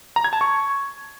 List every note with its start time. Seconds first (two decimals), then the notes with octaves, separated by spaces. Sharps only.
0.16 A#5
0.24 G#6
0.33 A5
0.41 C#6